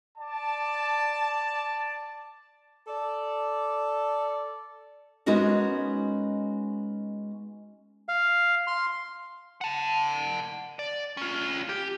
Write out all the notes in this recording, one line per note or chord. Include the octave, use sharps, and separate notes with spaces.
D5 A5
A4 D5
G#3 B3 C#4 D#4 F#4 A#4
F5
C6
F#5 A5
D5
C#4 F4
G4